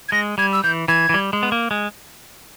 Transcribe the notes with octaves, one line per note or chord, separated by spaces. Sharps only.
G#6
G#3 A#6
G3 G#6
E6
E3 G6
E3 G#6
E3
G3
G#3
B3
A#3
G#3